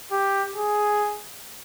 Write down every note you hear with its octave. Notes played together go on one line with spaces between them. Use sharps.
G4
G#4